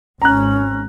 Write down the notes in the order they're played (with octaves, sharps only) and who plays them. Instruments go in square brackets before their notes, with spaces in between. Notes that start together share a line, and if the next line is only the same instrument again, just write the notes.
[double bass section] G#1 [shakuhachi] C#4 [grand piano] A#5 F#6